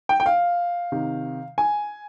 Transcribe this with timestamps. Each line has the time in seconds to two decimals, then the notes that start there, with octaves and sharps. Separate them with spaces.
0.09 G5
0.20 G5
0.26 F5
0.92 C3 D#3
1.58 G#5